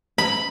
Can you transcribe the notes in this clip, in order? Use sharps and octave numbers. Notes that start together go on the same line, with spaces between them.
B5